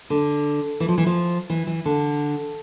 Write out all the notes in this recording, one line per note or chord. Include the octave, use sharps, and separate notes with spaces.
D3
E3
F3
E3
F3
E3
E3
D3